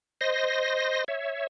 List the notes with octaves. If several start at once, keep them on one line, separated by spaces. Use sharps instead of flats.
C5 D#5 C6 A#6
C#5 E5